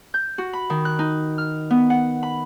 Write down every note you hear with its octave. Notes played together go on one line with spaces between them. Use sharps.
G6
F#4
B5
D#3
F#6
D#4
F6
B3
F#5
B5